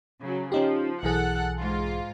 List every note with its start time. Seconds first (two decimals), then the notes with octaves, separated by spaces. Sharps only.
0.20 C#3 F#3
0.52 F3 C#4 D#4 G4
1.03 B1 E3 G#4 A4 F#5
1.59 G#2 F4